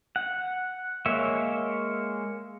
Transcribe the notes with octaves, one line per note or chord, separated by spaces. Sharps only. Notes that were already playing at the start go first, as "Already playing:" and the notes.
F#5
G#3 A#3 C#5 E5